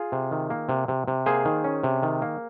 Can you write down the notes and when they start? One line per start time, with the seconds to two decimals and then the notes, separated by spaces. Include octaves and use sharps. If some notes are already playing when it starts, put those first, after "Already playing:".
Already playing: F4 G#4
0.12 C3
0.31 D#3
0.50 A#3
0.69 C3
0.88 C3
1.08 C3
1.26 A#3 G#4 C5
1.45 D#3
1.64 C#4
1.83 C3
2.03 D#3
2.22 A#3